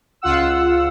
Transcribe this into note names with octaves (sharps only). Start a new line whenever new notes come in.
C#2 F4 F#5 E6